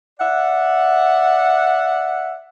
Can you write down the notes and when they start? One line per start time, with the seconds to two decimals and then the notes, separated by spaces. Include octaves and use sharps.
0.19 D5 E5 F#5